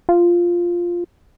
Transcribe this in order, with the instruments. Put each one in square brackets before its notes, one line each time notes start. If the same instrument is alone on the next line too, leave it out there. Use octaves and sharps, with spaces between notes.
[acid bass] F4